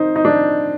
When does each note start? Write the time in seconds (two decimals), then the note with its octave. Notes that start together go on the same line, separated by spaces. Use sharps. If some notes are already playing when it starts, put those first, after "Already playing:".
Already playing: D#4 C5
0.16 D#4
0.25 D4